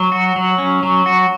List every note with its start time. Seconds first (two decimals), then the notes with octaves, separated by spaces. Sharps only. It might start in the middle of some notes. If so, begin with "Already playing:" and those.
Already playing: F#3
0.12 F#4
0.36 F#3
0.58 C#4
0.83 F#3
1.06 F#4